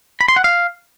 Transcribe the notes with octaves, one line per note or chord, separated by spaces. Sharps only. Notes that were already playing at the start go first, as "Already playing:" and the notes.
B5
C6
F#5
F5